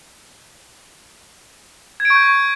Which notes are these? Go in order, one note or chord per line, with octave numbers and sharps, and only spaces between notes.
G#6
D7
C#6
G6